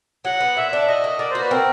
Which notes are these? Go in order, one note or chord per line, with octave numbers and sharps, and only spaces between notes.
F#3 F#5
B3
A#2 E5
D4
F#4 D#5
A#3
A#3 D5
F#4 C5
B4
C4 A#4